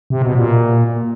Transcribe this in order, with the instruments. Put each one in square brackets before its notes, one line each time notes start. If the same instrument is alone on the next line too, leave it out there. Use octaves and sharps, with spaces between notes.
[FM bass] C3
B2
A#2